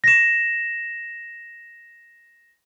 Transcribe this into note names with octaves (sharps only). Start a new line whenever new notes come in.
A#6 E7